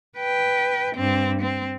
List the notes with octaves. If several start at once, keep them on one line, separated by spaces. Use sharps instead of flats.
B4 G5
G2 C4
C4